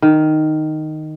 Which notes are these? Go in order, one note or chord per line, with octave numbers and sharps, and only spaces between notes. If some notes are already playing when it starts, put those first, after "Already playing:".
D#3